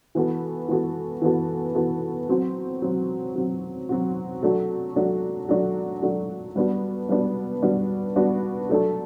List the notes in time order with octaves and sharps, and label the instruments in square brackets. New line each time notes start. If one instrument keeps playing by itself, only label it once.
[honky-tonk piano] E3 B3 F#4 A4
E3 B3 F#4 A4
E3 B3 F#4 A4
E3 B3 F#4 A4
F#3 C4 F#4
F#3 C4 F#4
F#3 C4 F#4
F#3 C4 F#4
F#3 A3 D4 F#4
F#3 A3 D4 F#4
F#3 A3 D4 F#4
F#3 A3 D4 F#4
G3 B3 D4 F#4
G3 B3 D4 F#4
G3 B3 D4 F#4
G3 B3 D4 F#4
F#3 A3 D4 A4